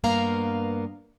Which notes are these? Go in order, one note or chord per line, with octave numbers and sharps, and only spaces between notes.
G2 A#3 B3 F5 A#5